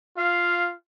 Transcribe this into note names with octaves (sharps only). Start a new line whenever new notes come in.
F4 F5